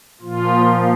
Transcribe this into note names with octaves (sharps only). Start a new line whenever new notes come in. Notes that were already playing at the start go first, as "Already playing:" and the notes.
A#2 F3 F4